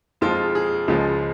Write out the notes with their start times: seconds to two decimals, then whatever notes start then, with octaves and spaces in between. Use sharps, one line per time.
0.21 F2 F3 G#3 F4
0.55 G#4
0.88 C#2 C#3 F3 G#3 F4